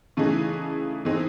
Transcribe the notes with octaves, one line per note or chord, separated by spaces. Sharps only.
C#3 E3 A3 D#4 G#4
E3 C4 D#4 G#4